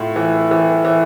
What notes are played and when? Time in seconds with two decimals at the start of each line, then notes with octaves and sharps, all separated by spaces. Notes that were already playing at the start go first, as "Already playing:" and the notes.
Already playing: A2 F4
0.16 E3
0.51 E3
0.85 E3